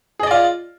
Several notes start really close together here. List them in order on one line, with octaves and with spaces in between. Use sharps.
G#4 D#5 D5 F4